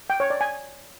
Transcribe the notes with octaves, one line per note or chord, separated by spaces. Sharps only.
G5
C#5
D5
G#5